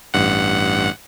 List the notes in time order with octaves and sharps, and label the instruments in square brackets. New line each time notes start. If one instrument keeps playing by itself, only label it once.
[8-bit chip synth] A1 G2 F#5